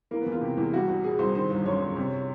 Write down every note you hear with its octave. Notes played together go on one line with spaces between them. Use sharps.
E3 A#3
B3
E2
F4
C3 G4
E2
G3 F#4
C2
A#2 G#4
C2 C5
D#3 C5
G1
F#2 C#5
G1
C3